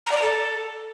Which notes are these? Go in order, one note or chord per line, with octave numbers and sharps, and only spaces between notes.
A#5
D5
A#5
A4